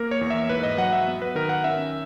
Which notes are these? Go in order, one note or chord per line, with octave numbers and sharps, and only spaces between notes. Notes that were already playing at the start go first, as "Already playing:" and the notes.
Already playing: A#3 A#4
C#5
E2
E5
G#2 B4
D#5
F#3 F#5
E5
B3
B4
D#3 A#4
F#5
C#4 E5